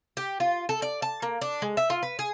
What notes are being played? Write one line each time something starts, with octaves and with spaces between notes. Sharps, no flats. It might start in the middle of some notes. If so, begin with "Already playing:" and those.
G4
F4
A4
D5
A5
A#3
D4
G#3
E5
F4
B4
G#4